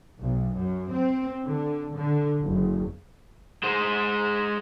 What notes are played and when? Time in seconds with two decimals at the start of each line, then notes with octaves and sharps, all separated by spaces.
0.21 B1
0.57 F#2
0.94 C4
1.46 D3
1.97 D3
2.44 F#1
3.63 G#3 C5